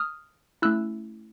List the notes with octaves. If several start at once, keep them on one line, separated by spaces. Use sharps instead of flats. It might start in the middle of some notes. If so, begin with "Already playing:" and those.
Already playing: D#6 F6
A3 C#4 E4 E6 F#6